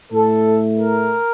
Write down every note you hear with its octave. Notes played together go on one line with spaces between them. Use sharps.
A2 A3 A4
A#4